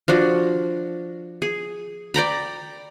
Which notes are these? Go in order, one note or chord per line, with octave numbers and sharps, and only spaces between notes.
F3 D4 F#4
G#4
D5 G5 A#5 B5